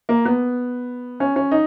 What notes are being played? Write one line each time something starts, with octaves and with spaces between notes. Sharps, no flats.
A#3
B3
C#4
C#4
D#4